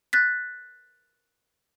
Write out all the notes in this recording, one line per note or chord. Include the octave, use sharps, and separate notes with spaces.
F#6 A6 B6